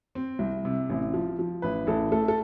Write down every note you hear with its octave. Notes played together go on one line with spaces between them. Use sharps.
C4
C2
C3
A1
F3
F3
A1 B4
A1 A4
A3 A4
A4